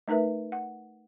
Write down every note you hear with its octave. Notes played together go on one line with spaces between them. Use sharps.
A3 D#4 A#4 B4 E5
F#5